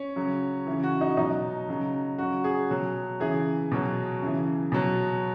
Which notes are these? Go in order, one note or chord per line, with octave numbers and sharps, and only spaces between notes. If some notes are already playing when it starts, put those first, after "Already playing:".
Already playing: C#4
C#3 F#3
C#3 E3
F#4
D#4
B2 F#3 D#4
C#3 F#3
C#3 F#3 F#4
G#4
B2 F#3
C#3 E3 G#4
B2 F#3
C#3 E3
B2 F#3